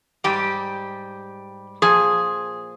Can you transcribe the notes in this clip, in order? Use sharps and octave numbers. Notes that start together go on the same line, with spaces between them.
G#2 G3 G4
A#2 F3 G#4